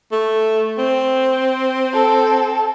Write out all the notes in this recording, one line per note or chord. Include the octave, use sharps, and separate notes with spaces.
A3
C4
A4